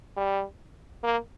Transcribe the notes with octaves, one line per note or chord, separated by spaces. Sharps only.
G3
A#3